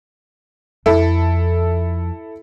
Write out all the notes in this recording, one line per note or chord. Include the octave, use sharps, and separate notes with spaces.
F2 E4 A4